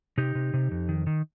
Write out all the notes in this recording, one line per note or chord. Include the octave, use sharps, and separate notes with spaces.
C3 D#4 G4
C3
C3
F2
D#3
D#3